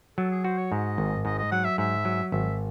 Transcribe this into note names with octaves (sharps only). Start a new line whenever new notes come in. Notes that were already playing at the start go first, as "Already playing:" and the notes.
F#3 A4
G#4
F#4 C5
C#5
G#2 D#5
G#1
G#2 D#5
D#5
F#3 F#5
E5
G#2 E5
F#3
G#1 E5